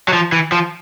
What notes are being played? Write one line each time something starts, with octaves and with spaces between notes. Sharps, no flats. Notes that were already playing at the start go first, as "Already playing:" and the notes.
F#3
F3
E3
F3